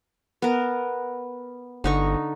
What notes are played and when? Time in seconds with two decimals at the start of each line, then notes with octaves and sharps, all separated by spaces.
0.42 B3 A#4
1.84 G1 D3 D#4 C#6